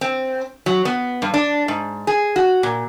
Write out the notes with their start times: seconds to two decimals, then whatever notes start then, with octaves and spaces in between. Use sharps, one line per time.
0.01 C4
0.66 F#3
0.85 B3
1.22 G2
1.34 D4
1.68 G#2
2.07 G#4
2.36 F#4
2.63 A#2